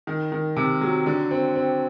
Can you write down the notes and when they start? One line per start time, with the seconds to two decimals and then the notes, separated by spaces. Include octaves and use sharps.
0.07 D#3
0.32 D#3
0.56 C3
0.81 F#3
1.06 D3
1.31 C4
1.55 C4